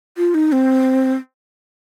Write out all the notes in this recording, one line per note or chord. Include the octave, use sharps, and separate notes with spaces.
F4
D#4
C4